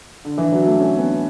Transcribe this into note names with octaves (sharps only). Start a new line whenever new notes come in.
D3
E3
F#3
A3
C#4
B3